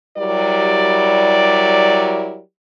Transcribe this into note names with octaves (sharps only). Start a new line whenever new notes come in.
F#3 G3 E4 G4 A#4 D5